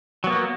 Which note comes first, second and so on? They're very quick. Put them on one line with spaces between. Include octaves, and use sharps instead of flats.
F#3 B3 A#3